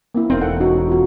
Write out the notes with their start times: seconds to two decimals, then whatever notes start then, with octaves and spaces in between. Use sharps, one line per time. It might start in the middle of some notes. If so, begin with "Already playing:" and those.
0.14 A#3 C4 E4
0.30 E1 C4 D#4 A#4 F5
0.41 A4 F#5
0.60 C#4 D#4 F#4
0.89 F4 F#4